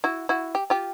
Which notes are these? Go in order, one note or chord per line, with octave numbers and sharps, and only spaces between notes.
E4 F#4
E4 F#4
G4
F4 G4